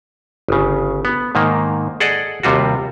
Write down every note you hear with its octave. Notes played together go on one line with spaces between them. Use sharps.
G1 C#3
B3
G#2 D#3 A#3
G#4 A4 D5 D#5 F#5
D#2 C3 G3 F4 F#4